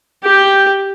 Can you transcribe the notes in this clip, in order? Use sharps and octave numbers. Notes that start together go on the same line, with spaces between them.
G4 G5